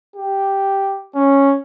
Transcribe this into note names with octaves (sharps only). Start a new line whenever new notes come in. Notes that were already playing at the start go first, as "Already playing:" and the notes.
G4
C#4